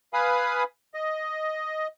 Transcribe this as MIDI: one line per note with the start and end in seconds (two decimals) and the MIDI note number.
0.14 0.63 71
0.14 0.63 77
0.14 0.63 80
0.14 0.63 83
0.14 0.63 87
0.94 1.87 75